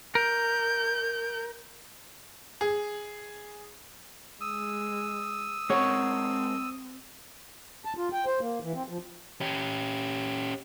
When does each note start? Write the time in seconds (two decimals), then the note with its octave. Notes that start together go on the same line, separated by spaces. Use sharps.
0.15 A#4 G6
2.61 G#4
4.41 G#3 D#6 E6
5.70 G#3 C4 A#4 C#5 F#5
7.85 A5
7.97 F4
8.13 G5
8.26 C5
8.40 A#3
8.62 E3
8.74 C4
8.89 F3
9.41 C#4 G4